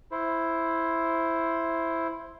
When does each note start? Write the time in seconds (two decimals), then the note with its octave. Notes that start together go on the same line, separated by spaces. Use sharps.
0.12 E4 C5